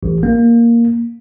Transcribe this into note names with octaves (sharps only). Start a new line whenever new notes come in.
A1
A#3